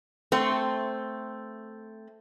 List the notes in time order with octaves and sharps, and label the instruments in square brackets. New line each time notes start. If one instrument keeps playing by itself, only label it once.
[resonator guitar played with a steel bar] A3 C4